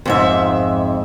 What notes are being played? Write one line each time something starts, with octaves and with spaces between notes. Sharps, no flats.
F2 G#2 E5